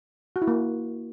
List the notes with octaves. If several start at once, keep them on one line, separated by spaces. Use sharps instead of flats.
F#4
E4
A#3